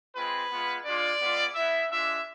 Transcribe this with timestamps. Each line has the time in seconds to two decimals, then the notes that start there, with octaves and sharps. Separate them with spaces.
0.16 G#3 C4 F4 B4
0.51 G#3 B3 F4
0.85 G#3 D4 F4 D5
1.20 G#3 B3 F4
1.55 B3 E4 E5
1.90 G#3 D4 F4 E5